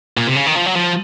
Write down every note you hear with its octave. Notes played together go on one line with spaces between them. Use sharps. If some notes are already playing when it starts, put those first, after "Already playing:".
A#2
C3
C#3
D#3
F3
F#3
F3